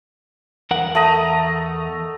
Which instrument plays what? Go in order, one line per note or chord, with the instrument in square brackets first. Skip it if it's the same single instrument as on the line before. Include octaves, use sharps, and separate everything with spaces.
[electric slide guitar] E2 A#4 F#5
[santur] A3 D#5 A#5